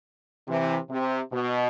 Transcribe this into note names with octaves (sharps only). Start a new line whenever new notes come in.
C3 E3
C3
B2